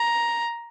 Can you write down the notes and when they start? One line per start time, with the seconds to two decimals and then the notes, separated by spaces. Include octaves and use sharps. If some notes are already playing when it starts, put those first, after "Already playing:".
Already playing: A#5